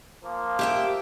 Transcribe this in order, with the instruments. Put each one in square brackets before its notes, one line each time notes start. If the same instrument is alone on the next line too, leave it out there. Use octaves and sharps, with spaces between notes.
[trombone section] F3 A#3
[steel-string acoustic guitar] G4 E5 G5